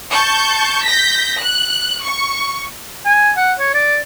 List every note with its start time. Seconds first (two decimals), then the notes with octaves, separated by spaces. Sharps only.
0.11 A5 C#6 G6
0.84 G6 A#6 B6
1.41 F#6
2.03 C#6
3.05 G#5
3.37 F#5
3.59 C#5
3.74 D5